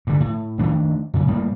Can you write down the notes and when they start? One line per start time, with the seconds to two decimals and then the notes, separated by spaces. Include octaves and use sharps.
0.07 G2 D3
0.20 A2
0.59 D#3 A3 D4
1.14 F#2 C#3
1.28 A2 G3 A#3